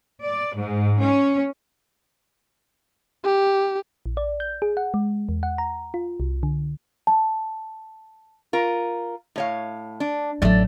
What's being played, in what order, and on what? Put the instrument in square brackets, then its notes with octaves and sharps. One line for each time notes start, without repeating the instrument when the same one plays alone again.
[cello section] D5
G#2
C#4
[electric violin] G4
[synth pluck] A#1
D5
G6
G#4
F#5
G#3
E2
F#5
A#5
F4
C2
D3
[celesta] A5
[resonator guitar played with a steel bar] F4 A#4
A2 C#5 F5
D4
[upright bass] A1 F#3 [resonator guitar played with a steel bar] A3 D5